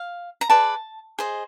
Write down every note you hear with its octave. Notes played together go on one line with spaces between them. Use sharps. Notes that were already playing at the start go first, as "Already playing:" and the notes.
Already playing: F5
A#5
G#4 B4 D5 A5
G#4 C5 D#5